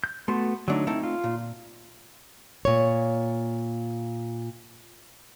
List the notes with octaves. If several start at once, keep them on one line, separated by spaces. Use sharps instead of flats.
G6
A3 B3 F#4 C6
D3 F#3 A3 D4 D#4
A3 C4 D#4 E4
F4
A#2
A#2 C#5